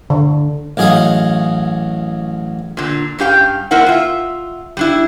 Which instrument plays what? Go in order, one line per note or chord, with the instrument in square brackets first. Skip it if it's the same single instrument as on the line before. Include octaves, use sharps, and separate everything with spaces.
[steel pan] D3
[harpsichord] A1 F#3 G#4 D#5 F5
[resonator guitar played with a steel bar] A#2 D3
G2 C#4 G4 F5 G5
A#3 C4 E4 A#4 F#5
F4 E5
G3 D4 E4